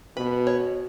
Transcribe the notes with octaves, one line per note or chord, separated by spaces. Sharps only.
B2 B4
C#5